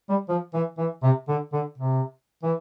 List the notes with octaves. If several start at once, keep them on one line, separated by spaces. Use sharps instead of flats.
G3
F3
E3
E3
C3
D3
D3
C3
E3